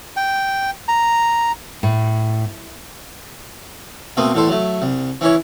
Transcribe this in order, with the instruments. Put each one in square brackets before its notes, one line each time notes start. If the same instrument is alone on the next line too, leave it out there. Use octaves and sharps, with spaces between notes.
[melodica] G5
A#5
[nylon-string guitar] A2
[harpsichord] B2 A3 A#3 C4 D#6
E2 A2 A4 C5
F#3 A3
C2
E3 C#4 E4 C#5